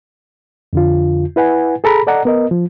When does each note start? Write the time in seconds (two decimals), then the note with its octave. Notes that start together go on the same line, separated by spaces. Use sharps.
0.73 F2 D3 F4
1.36 E4 B4 F#5 G#5
1.84 G#4 A4 A#5 B5
2.07 A4 D5 D#5 F#5 A#5
2.25 B3 A#4 D#5
2.51 F3